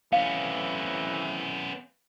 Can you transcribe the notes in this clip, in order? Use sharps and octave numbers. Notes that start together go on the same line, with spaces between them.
A2 C3 E3 B3 C#4 F5